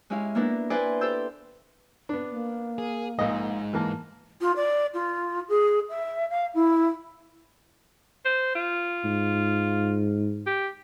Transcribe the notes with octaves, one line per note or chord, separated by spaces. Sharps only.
G#3 C#4 E4 G4 F5
A#3 B3 D4 E4 A#4
E4 B4 C5 D5 G5 G#5
G4 A4 C5 E6 G6
B3 D4
A#3
G#4
A#1 G#2 D#5
E3 A#3 A5
F4
D5
F4
G#4
E5
F5
E4
C5
F4
G#2
G4